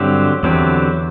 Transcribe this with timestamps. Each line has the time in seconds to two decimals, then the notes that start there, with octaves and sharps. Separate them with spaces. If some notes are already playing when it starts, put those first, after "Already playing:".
Already playing: G2 D3 F#3 C4 G4
0.43 E2 D3 F#3 C4 G4